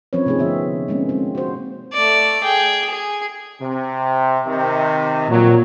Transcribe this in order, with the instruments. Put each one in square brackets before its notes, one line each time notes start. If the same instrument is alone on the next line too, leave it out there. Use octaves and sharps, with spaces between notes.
[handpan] F3 C4 C#4 B4 C#5
C3 A3 C4 D#4 G#4
D3 B3 E5
G#3 A#3 C4 C#4
C4
F#4 C5
[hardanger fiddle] A3 D5
G#4 G5
G#4
[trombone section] C3
C3 D#3
[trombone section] F2 F3 F#3 [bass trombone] A#2